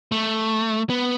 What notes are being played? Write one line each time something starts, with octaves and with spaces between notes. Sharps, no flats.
A3
B3